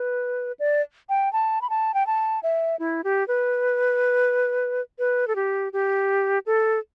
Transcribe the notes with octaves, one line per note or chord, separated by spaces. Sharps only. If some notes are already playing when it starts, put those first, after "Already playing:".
Already playing: B4
D5
G5
A5
B5
A5
G5
A5
E5
E4
G4
B4
B4
A4
G4
G4
A4